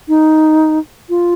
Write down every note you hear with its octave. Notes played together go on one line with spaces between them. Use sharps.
D#4
F4